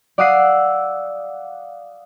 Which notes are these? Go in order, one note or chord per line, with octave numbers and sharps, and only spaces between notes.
D5 F5 F#5 D#6 E6 C7